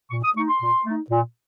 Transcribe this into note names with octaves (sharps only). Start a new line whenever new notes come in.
A#2 C#6
D#6
A3 D#4 C#6
C6
A#2
A3 D#4
A#2